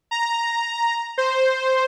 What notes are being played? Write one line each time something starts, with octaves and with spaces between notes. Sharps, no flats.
A#5
C5